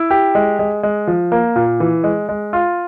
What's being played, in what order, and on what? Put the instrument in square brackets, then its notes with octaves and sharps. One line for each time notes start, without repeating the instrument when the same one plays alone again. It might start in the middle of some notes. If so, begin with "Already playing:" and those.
Already playing: [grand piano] E4
G4
G#3
G#3
G#3
F3
A#3
A#2
E3
G#3
G#3
F4